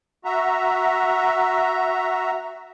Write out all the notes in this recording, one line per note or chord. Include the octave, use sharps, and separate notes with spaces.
F#4 E5 A#5